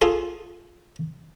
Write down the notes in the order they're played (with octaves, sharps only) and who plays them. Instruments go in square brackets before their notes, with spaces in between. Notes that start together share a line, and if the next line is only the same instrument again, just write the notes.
[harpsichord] F4 G#4 A4 C6